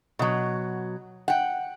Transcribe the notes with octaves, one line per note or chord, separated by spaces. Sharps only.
B2 F#3
F#5 G5